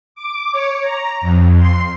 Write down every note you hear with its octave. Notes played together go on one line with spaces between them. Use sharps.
D6
C#5
A#5
F2
C6